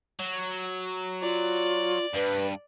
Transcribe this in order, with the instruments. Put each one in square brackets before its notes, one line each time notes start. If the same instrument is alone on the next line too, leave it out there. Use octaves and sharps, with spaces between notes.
[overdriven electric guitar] F#3
[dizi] F4 [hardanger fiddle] D5
[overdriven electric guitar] G2 [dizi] B4